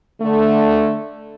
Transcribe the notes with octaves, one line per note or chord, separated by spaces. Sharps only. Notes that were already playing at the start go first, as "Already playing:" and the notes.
D3 A3